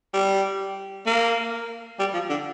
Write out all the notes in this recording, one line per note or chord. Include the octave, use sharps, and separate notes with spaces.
G3
A#3
G3
F3
D3